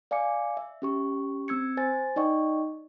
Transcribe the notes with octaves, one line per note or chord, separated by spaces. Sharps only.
D5 F5 G#5 D6 C#7
E5
C#4 G4 C#6
C4 E6 G#6 C#7
C5 G#5 A6
D#4 D5 D#5 G5 C#6